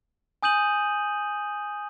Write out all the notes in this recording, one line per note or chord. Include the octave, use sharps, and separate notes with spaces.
G#5 D#6 G6 D#7 F#7